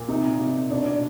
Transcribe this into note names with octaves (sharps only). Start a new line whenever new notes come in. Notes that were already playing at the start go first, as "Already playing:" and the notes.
Already playing: A#2
C3 D#4
C3
B2 D4
D4